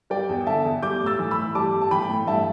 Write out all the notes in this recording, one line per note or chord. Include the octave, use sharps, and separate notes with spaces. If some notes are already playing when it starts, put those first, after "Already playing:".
G3 D5 G5
E2
D3 E5 A5
E2
G3 D6 G6
A2
E6 A6
E3
B5 E6
A2
G3 A5 D6
A2
A5
E3 G5 B5
A2
G2 E5 A5